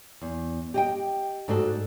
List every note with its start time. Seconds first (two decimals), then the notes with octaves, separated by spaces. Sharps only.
0.22 E2
0.74 G4 D#5 G5
1.48 G#2 A3 D4 F#4 A4